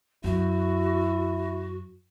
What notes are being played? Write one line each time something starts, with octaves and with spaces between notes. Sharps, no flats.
F#2 E4 F#4